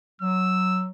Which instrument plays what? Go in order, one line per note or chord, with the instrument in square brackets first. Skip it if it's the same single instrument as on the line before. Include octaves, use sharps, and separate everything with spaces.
[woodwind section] F#3 [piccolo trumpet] E6